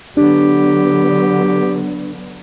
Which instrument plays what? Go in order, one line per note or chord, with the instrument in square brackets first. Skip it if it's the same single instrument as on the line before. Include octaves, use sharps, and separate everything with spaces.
[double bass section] D3 F#3 B3 [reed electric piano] D4 [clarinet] G4